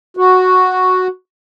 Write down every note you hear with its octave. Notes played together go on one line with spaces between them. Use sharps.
F#4